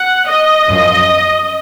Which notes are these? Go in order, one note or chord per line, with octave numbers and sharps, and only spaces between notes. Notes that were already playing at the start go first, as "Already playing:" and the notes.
Already playing: F#5
D#5
F#2 F3